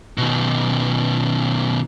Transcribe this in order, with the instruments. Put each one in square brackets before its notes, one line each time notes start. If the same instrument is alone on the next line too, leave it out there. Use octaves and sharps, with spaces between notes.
[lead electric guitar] B2 D#3